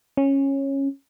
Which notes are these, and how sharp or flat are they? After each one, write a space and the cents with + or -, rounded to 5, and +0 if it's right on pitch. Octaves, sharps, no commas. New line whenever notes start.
C#4 -15